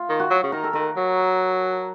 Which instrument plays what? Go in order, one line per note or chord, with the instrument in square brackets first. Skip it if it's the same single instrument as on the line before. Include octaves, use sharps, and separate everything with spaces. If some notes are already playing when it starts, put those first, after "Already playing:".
Already playing: [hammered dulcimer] F4
[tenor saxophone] D#3
[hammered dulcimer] F#4
[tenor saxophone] F#3
C#3
[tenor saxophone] D#3 [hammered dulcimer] A#4
[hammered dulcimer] A4
[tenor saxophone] D#3 [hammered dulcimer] A#4
[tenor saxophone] F#3